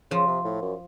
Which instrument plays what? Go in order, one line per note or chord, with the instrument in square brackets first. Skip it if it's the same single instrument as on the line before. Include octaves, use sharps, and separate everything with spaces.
[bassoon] C#3 [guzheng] F3
[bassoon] C3
A2
F#2